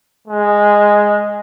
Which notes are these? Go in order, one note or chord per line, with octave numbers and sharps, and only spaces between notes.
G#3